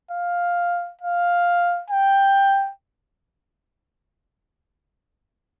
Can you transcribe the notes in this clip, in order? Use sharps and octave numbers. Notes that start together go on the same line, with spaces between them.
F5
F5
G5